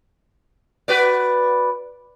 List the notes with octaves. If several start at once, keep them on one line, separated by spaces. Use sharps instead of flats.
F#4 B4 D5